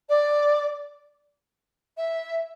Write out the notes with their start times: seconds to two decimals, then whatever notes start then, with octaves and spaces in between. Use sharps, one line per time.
0.09 D5
1.97 E5